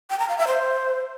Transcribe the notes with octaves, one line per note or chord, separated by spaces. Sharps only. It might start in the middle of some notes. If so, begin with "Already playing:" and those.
G5
A#5
F5
E5
C5